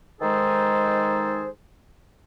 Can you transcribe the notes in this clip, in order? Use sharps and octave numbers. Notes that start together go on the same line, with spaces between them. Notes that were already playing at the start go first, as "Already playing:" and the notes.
D#3 G#3 D#4 G#4 A4 C5